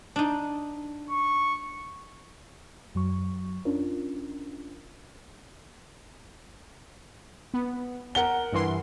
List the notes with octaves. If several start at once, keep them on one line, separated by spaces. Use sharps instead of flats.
D4 D#4
C#6
F#2 F#3 C#6
C#4 D4 F4 A#4
B3
A#4 F#5 G7
G2 E3 C6